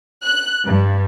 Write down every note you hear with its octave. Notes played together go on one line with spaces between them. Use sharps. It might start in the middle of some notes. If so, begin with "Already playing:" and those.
F#6
G2